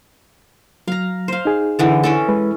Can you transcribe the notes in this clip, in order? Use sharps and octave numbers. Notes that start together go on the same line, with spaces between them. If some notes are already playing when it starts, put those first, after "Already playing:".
F#3 F5 A#5
C5 F5
D#4 G#4
D3 E3 A4
E3 C#4 A4
G#3 B4